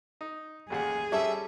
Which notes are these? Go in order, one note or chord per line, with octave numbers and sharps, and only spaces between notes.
D#4
A1 D#2 G#4 F#5
G3 C#4 A4 E5